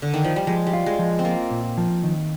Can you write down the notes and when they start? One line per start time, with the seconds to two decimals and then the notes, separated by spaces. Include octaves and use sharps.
0.02 D3
0.14 D#3
0.24 F3
0.36 G3
0.47 F3 G#3
0.67 G3
0.73 F4
0.86 G#3
0.99 F3
1.19 C4
1.25 A#3 F4
1.51 A#2
1.77 F3
2.03 D#3